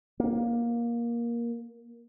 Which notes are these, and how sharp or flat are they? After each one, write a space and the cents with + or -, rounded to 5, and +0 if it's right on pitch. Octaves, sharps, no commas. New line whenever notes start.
A#3 +15